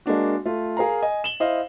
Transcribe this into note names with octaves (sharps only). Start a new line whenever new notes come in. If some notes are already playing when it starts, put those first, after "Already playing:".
G#3 A#3 D4 F#4
A3 F4
G#4 A#4 F5 A#5
D#5 G#5
E7 F#7 G7
E4 C5 D#5 F5